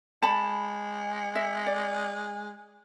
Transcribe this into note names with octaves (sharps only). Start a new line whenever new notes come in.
G#3 A5 B5
E5
D5